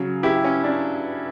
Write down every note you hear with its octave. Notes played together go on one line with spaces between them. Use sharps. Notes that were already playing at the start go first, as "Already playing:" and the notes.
Already playing: C#3 F#3
E4 G4
C#4
D4